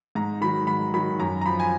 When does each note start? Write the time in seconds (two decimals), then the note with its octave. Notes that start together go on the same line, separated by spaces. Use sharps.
0.15 G#2 A#5
0.41 D#3 F#3 B5
0.67 G#2 B5
0.94 D#3 F#3 B5
1.19 F#2 A#5
1.41 A#5
1.45 F3 B5
1.60 G#5